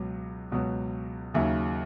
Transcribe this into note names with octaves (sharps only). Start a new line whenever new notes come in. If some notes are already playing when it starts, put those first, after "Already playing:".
Already playing: C#2 B2 F#3
C#2 B2 F#3
D#2 C#3 F#3 E5